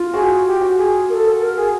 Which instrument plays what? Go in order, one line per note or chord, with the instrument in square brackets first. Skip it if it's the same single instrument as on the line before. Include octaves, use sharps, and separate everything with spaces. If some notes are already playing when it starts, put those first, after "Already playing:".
Already playing: [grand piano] F4
[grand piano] F#4 [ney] G#4
[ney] G4
[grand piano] F#4
[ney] G#4
A#4
A4
A#4
G#4